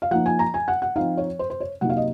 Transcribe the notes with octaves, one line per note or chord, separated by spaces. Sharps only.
F5
F3 A#3 D#4 F#5
G#5
A#5
G#5
F#5
F#5
F3 C4 D#4 F5
C#5
C5
C5
C#5
C3 F#3 A#3 D#4 F#5
F5
D#5